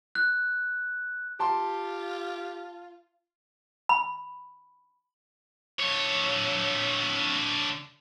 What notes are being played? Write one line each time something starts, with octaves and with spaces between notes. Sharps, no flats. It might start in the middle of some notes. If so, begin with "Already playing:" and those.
F#6
F4 G4 A5 C6
B5
D3 C#5